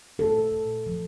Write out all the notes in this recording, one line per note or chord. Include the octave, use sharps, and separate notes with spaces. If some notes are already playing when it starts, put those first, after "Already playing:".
A#2 A4
A#2
F3